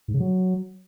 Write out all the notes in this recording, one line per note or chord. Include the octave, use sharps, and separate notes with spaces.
G#2
C#3
F#3